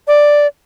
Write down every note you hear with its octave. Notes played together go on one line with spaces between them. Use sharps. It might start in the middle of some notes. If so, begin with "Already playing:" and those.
D5